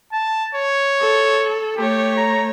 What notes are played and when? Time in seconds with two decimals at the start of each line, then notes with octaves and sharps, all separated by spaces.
0.13 A5
0.55 C#5
1.01 A4
1.77 A3 G4 C#5
2.17 A#5